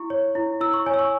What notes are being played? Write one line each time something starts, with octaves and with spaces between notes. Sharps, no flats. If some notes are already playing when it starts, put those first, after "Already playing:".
Already playing: E4 C#6
C#5
E4
E4 E6
C#6
C#5 G#5
E6
C#6